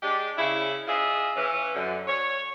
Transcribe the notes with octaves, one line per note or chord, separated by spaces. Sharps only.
G#3 D4 G4
C#3 E4
F4 G#4 D#5 E5
E3 C#4
F#2 D3
C#5